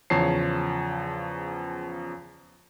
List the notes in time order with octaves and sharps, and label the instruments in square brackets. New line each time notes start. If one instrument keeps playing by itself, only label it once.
[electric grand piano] E2 C#3 F3 C#5 A5 C7